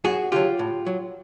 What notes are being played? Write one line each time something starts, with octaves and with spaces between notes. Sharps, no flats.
F#2 F#4 G#4
D3 F#3 F4 G4
A2
F#3